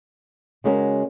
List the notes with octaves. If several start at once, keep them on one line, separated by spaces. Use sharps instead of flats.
C#3 G#3 C#4 F#4 A#4